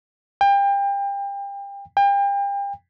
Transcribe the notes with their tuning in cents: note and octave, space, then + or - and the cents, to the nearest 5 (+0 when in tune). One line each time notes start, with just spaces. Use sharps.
G5 +30
G5 +35